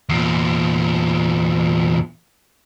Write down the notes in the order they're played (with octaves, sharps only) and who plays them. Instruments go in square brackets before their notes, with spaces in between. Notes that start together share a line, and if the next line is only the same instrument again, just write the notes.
[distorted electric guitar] E2 A#2